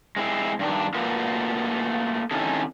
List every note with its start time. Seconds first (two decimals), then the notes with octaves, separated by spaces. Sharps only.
0.16 G#3 C4 E4
0.59 G2 D#3 D4
0.94 A3 A#3 F4 F#4 A#4 B4
2.31 D#3 C4 C#4 D#4 E4 A4